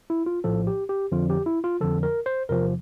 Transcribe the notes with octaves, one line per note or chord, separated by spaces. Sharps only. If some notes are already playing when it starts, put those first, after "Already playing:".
E4
F4
A#1 A2 F3 A4
G4
G4
F2 D3 F3 F4
G4
E4
F4
F2 D3 F3 A4
A#4
C5
E2 C3 F3 A#4